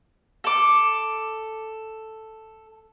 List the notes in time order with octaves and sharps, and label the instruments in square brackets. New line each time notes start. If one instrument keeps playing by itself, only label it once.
[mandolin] A4 D6